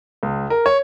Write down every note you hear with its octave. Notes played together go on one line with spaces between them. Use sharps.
C#2
A#4
C#5